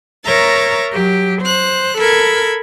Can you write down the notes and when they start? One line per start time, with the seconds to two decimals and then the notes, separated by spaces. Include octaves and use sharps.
0.25 A#4 C#5 E5 A#5 A6
0.92 F#3 G4
1.41 C5 F#6
1.97 A4 A#4 B5 G#6